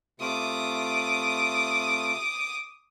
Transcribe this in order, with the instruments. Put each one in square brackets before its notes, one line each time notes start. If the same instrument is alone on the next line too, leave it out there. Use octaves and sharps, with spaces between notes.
[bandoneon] C3 A3 F4 [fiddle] D6 D#6